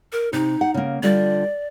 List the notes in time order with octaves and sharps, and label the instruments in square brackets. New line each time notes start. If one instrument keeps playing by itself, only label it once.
[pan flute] A#4
[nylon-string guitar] C3 [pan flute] D#4
[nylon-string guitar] F#5
C#3 A#3
[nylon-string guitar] D3 G3 F4 [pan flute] D5